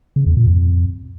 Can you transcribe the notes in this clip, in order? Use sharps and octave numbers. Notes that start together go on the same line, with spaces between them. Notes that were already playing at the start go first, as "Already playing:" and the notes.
C#3
E2
A#2
F2